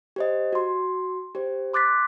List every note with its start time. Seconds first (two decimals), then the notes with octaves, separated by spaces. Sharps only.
0.16 G4 C5 D#5
0.53 F#4 C6
1.35 G4 C5
1.74 C6 D6 F#6 A6 B6